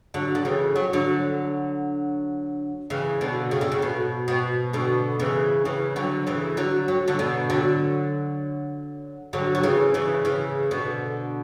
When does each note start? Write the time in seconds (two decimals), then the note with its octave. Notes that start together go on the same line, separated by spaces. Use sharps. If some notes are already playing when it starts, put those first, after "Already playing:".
0.14 D3 F#3
0.35 D3
0.45 C#3 E3
0.76 F#3
0.93 D3 F#3
2.90 C#3 E3
3.21 B2 D3
3.51 C#3
3.61 D3
3.72 C#3
3.82 B2
4.28 B2
4.73 B2 D3
5.20 C#3 E3
5.65 C#3 E3
5.96 D3 F#3
6.27 C#3 E3
6.57 D3 F#3
6.88 F#3
7.08 D3 F#3
7.19 B2 D3
7.50 D3 F#3
9.33 D3 F#3
9.55 F#3
9.63 C#3 E3
9.94 C#3 E3
10.25 C#3 E3
10.71 B2 D3